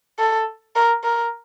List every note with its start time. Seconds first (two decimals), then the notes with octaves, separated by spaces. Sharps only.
0.19 A4
0.76 A#4
1.04 A#4